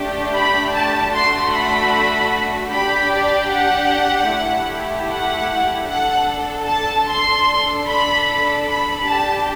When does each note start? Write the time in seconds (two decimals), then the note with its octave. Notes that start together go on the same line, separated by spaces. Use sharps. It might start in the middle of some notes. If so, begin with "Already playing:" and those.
Already playing: A3 D4 G4
0.33 B5
0.72 A5
1.12 A3 D4 F#4 A4 C6
1.52 B5
2.71 D4 G4 B5
3.11 D5
3.50 F#5
4.29 A3 E4 G4
5.09 F#5
5.88 D4 A4 F#5
6.67 A5
7.07 C6
7.46 D4 A4
7.86 B5
8.66 B5
9.05 D4 G4 A5